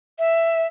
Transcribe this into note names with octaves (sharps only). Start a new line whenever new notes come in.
E5